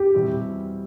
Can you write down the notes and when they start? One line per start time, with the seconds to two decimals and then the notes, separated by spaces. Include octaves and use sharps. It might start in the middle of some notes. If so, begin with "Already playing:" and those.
Already playing: G4
0.14 E2 B2 G3 C4 E4